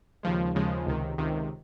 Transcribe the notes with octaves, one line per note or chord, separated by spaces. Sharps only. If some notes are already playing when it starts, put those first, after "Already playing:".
D#2 C#3 F3 G#3
D#2 C#3 F3 G#3
C#2 C3 D#3
C#2 C3 D#3